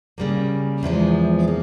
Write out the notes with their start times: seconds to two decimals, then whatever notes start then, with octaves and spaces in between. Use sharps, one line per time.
0.18 C#3 G3 A#3
0.83 E2 C3 F3 G#3
1.48 A#3